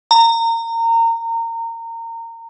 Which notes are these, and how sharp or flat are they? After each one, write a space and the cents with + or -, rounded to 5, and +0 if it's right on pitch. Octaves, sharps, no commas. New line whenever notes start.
A#5 -25